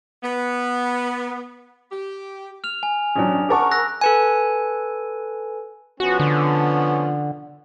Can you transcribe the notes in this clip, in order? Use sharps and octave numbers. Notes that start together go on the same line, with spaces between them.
B3
G4
F6 F7
G#5
A1 E3 F#3 C#4 D4
G#4 A#4 F#5 A5 C#6 D6
E6 F#6 A#6
A4 B4 G#5
F3 B3 C#4 F#4
D3